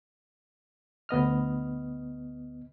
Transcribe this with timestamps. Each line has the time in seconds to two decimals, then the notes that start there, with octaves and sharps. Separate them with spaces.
1.09 D2 B3 D#5 F6